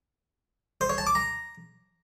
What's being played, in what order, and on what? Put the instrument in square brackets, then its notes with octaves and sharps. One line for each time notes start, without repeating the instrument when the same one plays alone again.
[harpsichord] C5
C#5
A5
D6
A#5